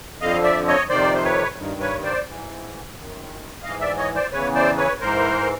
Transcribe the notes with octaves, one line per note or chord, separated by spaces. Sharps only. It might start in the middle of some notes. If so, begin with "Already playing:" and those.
F2 D3 F3 D#5 F5
D5 E5
C#5 D#5
F2 C3 D#3 C5 D5
C5
B4 C#5
G2 D#3
B4 C#5
C5 D5
G#2 E3
F#2 D#3
G#2 E3 D#5 F5
D5 E5
C#5 D#5
C5 D5
E2 C#3 E3 B4 C#5
C5 D5
B4 C#5
G#2 E3 A#4 C5